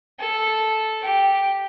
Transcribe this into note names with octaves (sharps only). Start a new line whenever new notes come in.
A4
G4